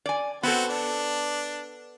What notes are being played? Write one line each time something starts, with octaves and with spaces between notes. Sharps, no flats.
D5 G#5
B3 C4 F#4 A4
D4